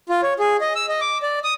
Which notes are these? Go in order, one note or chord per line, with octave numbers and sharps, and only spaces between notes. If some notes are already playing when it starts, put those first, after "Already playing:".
F4
C#5
G#4
D#5
E6
D#5
D6
D5
D#6